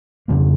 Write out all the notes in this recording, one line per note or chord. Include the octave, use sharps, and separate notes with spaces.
F2 C#3 F3 A#3